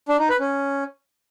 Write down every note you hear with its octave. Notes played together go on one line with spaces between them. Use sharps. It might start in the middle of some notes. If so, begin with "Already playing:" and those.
D4
D#4
B4
C#4